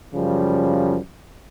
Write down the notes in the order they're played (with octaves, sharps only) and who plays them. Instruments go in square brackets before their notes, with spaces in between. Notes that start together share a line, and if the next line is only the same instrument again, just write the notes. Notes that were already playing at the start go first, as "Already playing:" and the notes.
[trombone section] F#2 C#3 F3 G3